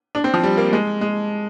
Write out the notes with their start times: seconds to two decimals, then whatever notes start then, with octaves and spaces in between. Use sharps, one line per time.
0.15 D4
0.24 C4
0.34 F3
0.44 G3
0.57 A#3
0.73 G#3
1.01 G#3